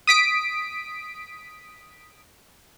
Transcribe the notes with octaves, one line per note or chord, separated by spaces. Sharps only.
D#6 B6 D7